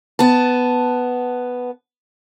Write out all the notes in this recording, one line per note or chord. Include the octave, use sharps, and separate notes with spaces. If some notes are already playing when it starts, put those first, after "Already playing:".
B3 A5